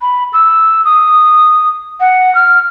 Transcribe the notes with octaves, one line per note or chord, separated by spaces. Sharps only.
B5
E6
D#6
F#5
F6